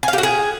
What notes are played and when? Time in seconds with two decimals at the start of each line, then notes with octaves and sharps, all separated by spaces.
0.03 G#5
0.08 F5
0.13 G4
0.18 F#4
0.23 G#4